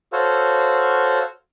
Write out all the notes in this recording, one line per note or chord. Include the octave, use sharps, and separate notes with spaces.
F#4 A4 C5 C#5 F5